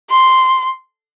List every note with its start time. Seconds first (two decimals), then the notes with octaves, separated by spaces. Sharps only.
0.10 C6